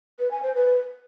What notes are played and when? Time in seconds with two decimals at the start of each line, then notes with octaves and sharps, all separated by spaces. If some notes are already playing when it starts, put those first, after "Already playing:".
0.19 B4
0.31 G#5
0.43 C5
0.55 B4